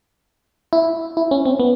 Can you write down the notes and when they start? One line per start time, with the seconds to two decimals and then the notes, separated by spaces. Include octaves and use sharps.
0.73 E4
1.17 E4
1.31 C#4
1.45 C4
1.60 B3